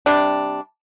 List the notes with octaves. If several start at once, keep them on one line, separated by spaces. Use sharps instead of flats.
C3 G3 D4